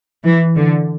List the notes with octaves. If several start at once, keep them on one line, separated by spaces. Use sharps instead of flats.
E3
D3